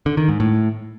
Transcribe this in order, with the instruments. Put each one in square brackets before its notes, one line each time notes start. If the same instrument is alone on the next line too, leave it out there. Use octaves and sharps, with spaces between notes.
[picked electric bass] D3
D#3
G#2
A2